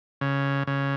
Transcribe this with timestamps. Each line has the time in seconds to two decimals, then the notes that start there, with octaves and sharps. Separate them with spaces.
0.21 C#3
0.67 C#3